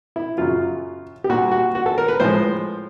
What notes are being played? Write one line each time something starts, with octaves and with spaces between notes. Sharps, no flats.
E4
F#2 C#3 F#3 F4
G4
A#2 G3 F#4
F#4
F#4
A4
A#4
B4
A2 F3 G#3 C5